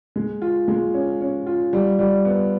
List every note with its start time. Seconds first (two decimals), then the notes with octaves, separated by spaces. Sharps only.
0.16 G#3
0.42 F4
0.68 G#3
0.94 C#4
1.21 C#4
1.46 F4
1.73 G3
1.99 G3
2.25 B3